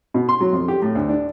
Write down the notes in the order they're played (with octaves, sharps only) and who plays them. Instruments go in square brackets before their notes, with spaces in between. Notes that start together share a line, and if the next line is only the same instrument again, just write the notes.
[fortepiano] B2
C6
F#3
F2
G4
A2
D2
D4